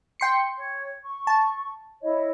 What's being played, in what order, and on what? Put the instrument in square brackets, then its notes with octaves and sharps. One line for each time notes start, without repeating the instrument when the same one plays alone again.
[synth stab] G5 C6 C#7
[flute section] C#5
C#6
[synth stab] A5
[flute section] E4 C#5 D#5